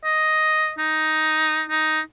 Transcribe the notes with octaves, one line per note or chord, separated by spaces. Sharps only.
D#5
D#4
D#4